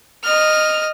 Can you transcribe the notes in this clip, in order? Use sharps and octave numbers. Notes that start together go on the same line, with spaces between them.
D#5 F6